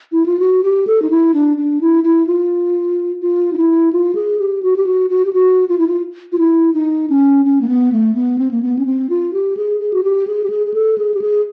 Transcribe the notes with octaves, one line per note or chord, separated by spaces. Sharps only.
E4
F4
F#4
G4
A4
D#4
E4
D4
D4
E4
E4
F4
F4
D#4
E4
F4
G#4
G4
F#4
G4
F#4
F#4
G4
F#4
F4
E4
F4
F4
E4
D#4
C#4
C#4
A#3
B3
A3
B3
C4
A#3
B3
C#4
C4
F4
G4
G#4
G#4
F#4
G4
G#4
G4
G#4
G#4
A4
G#4
G4
G#4